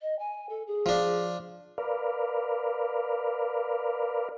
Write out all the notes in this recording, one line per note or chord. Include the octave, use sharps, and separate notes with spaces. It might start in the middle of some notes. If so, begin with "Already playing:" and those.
D#5
G#5
A4
G#4
F3 D4
A#4 B4 D5 F5